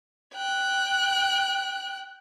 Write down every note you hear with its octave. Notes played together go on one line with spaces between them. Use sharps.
G5 F#6